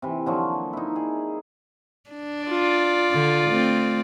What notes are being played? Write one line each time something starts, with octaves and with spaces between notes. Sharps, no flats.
C3 E3
D3 F3 F#3 A#3
D#4 E4
G#4
D4
F4 D5
D3
A3 C4